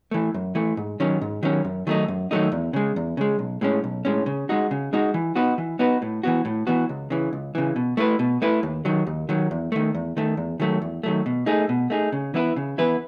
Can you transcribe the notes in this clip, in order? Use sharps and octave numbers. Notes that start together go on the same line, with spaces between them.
E3 A3
F#2
E3 A3
G#2
D#3 F#3 C#4
G#2
D#3 F#3 C#4
F#2
D#3 F#3 A3 D#4
F#2
D#3 F#3 A3 D#4
E2
C#3 G#3
E2
C#3 G#3
B1
A2 G#3 C#4
B1
A2 G#3 C#4
C#3
G#3 D#4 F#4
C#3
G#3 D#4 F#4
E3
B3 D#4 F#4 B4
E3
B3 D#4 F#4 B4
A2
E3 B3 F#4
A2
E3 B3 F#4
C#2
C#3 E3
C#2
C#3 E3
B2
A3 E4 B4
B2
A3 E4 B4
D#2
D#3 F#3
D#2
D#3 F#3
E2
D#3 A3
E2
D#3 A3
E2
D#3 F#3 A3
E2
D#3 F#3 A3
B2
A3 D#4 G#4
B2
A3 D#4 G#4
C#3
E3 B3 E4 B4
C#3
E3 B3 E4 B4